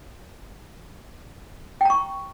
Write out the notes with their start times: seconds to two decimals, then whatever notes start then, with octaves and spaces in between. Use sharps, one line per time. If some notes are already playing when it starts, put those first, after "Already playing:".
1.81 G5
1.85 A#5
1.90 C#6